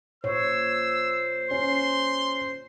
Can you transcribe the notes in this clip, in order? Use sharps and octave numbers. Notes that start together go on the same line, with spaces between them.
A#2 C5 C#5 E6
C#4 C6